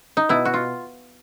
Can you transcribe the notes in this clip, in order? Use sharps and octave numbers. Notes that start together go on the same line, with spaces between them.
D#4
B2 E4
F#4
F4